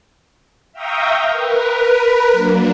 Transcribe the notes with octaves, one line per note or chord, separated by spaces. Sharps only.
E5 F5 G5 A#5 C#6 D#6
A#4 B4
F#3 A#3 D4